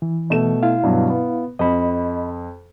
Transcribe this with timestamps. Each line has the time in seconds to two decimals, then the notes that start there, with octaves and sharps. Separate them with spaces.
0.02 E3
0.30 B2 A3 E7
0.63 E4 F5
0.84 G2 B2 F#3
1.09 B3
1.59 F2 D#5 B5